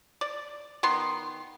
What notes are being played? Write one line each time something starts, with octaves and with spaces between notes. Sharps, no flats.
D5
D#3 B3 C6